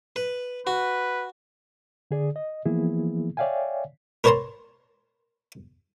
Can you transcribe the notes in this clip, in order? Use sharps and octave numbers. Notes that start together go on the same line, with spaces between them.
B4
F#4 B4
D3 G#4 D5
D#5
E3 F3 A#3 B3 E4 G#4
C#5 D5 E5 F5 G5 G#5
A#4 B4 C#5 A5 A#5 C6